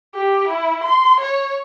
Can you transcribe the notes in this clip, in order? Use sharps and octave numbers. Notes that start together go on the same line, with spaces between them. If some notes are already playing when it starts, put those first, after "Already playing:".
G4
E4
C6
C#5